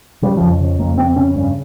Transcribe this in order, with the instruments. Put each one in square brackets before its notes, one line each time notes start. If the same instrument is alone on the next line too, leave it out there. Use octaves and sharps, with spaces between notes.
[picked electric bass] C#3 G3
F2 F3
C#3
F2 A#3
F2 C4
C#3 C#4
G2 C#4